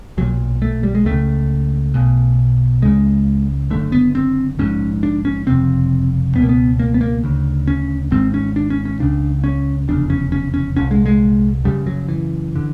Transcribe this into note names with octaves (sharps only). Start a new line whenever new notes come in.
B1 A#2 F#3
A3
G3
G#3
C#2 C#3 A3
B1 B2
C#2 C#3 G#3
F#1 F#2 D3 A3
B3
C4
A#1 G#2 C#4
D4
C#4
F#1 F2 C3 C4
C#2 B2 A#3 B3
B3
A#3
B3
A#3
D2 C#3
C#4
G#1 G#2 C4
C#4
D4
C#4
C#4
C#2 C#3 D4
C#4
F1 E2 C#3 D4
C#4
C#4
C#4
C2 A#2 C#4
G#3
G#3
F#1 F#2 C#3 G3
F#3
E3
D3